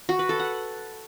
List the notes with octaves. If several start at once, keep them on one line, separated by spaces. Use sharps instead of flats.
F#4
B4
A4
F#5